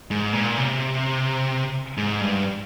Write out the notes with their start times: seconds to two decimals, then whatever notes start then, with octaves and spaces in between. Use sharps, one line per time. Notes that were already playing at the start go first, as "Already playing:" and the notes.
0.11 G#2
0.33 A#2
0.57 C3
1.97 G#2
2.21 G2